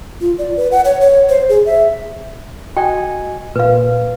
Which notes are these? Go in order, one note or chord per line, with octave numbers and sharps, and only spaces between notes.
F4
D5
B4
F#5
C#5
C#5
C5
G#4
E5
F#4 D#5 G5 G#5
A#2 B4 F5